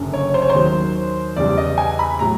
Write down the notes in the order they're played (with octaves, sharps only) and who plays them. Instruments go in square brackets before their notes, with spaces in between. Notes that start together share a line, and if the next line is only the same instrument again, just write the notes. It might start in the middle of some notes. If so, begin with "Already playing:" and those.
Already playing: [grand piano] F#1 F#2 D3
C#5
C5
C#5
C5
D#2 D#3 F#3
E2 C#3 E3 G3 D5
D#5
G#5
B5
A2 F#3 A#5